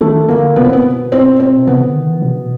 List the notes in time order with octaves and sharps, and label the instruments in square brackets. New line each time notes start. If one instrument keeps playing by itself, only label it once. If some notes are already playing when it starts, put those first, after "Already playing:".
[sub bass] D#3 [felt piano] A3
[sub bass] D3 [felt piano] A#3
[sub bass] B2 [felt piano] B3
[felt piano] C4
B3
C4
C4
[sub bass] C3 [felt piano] B3
[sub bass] D3
D#3
E3
B2